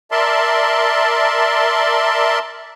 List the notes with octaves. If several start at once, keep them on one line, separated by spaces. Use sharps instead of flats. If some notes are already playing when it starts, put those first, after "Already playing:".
A#4 D5 E5 A5 C6